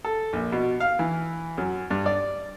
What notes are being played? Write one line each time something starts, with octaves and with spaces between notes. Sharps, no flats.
A4
A#1
B2
F5
E3
F#2
G2
D5